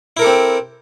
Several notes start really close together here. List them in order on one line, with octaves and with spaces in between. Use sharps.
E4 A#4 A4 G4 C4